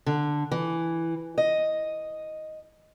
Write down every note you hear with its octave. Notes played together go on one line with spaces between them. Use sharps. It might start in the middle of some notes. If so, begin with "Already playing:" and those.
D3
E3
D#5